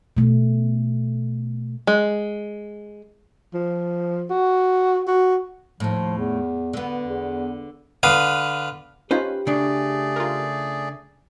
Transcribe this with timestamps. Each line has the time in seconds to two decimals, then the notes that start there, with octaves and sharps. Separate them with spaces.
0.17 B2 A3
1.87 G#3
3.54 F3
4.30 F#4
5.07 F#4
5.80 D#2 A2 F3
6.18 E2
6.73 D3 B3
7.08 E2
8.03 D3 B4 F5 D#6
9.11 C#4 D#4 F4 G4 B4 C5
9.47 C#3 A3 D4 G#4 D5
10.16 F4 A#4